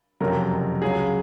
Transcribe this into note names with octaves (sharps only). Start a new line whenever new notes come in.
F#1 F2 C3 F#3 A#4
C#2 C#3 F#3 G#4